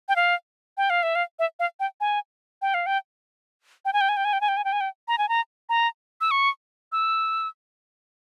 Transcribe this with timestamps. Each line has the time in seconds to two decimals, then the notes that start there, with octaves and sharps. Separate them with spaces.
0.09 G5
0.16 F5
0.77 G5
0.90 F5
1.03 E5
1.15 F5
1.39 E5
1.59 F5
1.80 G5
2.01 G#5
2.62 G5
2.74 F5
2.86 G5
3.85 G5
3.93 G#5
4.01 G5
4.09 G#5
4.17 G5
4.25 G#5
4.33 G5
4.41 G#5
4.48 G5
4.57 G#5
4.64 G5
4.73 G#5
4.81 G5
5.08 A#5
5.18 G#5
5.29 A#5
5.69 A#5
6.21 E6
6.31 C#6
6.92 E6